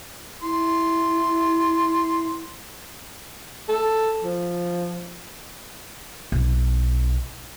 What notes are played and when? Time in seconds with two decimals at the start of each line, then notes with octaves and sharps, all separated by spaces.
0.42 E4 C6
3.69 A4
4.23 F3
6.32 B1